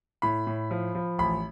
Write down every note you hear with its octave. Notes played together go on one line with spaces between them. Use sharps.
A2 B5
A2
F3
F3
A1 B5